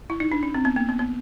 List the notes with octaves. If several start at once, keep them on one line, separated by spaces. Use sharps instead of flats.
E4
D#4
D4
C#4
C4
B3
A#3
B3
B3